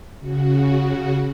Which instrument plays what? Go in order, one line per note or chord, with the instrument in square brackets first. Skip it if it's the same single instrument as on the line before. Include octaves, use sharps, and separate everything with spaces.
[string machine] C#3 F#4